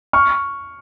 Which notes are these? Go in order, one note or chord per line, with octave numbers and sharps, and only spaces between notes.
C#6 F6